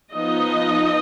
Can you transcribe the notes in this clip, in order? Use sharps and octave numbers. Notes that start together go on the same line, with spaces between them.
F3 B3 D#4 D#5